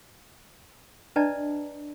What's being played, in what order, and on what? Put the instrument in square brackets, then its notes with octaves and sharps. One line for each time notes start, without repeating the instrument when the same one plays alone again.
[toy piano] D4 B4 D5 D#5 A5 A#5